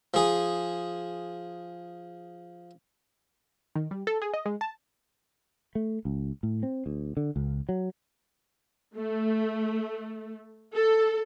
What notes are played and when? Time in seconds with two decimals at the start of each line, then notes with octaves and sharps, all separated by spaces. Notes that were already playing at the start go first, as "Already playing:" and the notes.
0.14 F3 G#4
3.76 D#3
3.91 G3
4.07 A4
4.22 G#4
4.34 D#5
4.46 G#3
4.61 A5
5.75 A3
6.05 C#2
6.43 A2
6.63 C4
6.86 D2
7.17 D3
7.36 C#2
7.69 F#3
8.96 A3
10.75 A4